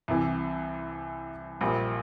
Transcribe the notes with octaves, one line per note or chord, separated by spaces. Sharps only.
C2 C3 E3
A#1 A#2 G3